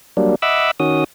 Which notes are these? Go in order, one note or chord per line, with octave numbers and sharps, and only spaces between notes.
F#3 G3 A#3 D4
D#5 E5 F#5 B5 D6 E6
D#3 C#4 F#4 D#6